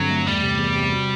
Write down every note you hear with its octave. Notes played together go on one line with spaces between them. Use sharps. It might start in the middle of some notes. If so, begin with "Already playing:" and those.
Already playing: G2 D3 F#3 C4
A3
E2 G3
C3
E2
C3
F#4